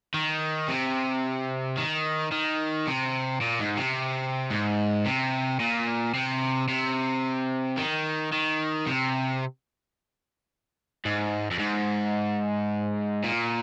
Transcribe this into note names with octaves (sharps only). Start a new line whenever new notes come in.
D#3
C3
D#3
D#3
C3
A#2
G#2
C3
G#2
C3
A#2
C3
C3
D#3
D#3
C3
G#2
F2
G#2
A#2